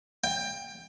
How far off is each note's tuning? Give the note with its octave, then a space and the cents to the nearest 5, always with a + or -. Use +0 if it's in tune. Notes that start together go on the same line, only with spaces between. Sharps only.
G5 +20